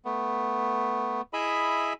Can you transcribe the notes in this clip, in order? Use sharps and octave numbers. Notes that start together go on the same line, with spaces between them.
A3 B3
E4 G#4 D#5 E5 B5